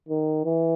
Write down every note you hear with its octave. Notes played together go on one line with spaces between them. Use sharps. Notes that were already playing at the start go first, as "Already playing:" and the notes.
D#3
E3